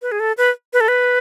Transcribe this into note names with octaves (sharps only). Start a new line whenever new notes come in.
B4
G#4
A4
B4
B4
A4
B4